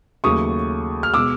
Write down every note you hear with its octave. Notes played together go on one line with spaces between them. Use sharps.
D#2 C#3 F#3 A3 C#6 D#6
F6
B2 G#3 D6 E6